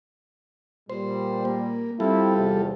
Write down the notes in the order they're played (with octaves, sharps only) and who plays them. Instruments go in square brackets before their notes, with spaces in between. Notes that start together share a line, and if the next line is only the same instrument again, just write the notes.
[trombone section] A#2 G3 [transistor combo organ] C5
[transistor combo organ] A#3
[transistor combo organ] G3 F4 A4 [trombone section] C4 E4
[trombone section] E2 C3